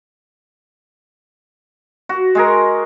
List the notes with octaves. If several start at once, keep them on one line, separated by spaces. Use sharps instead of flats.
F#4
G#3 G#4 A#4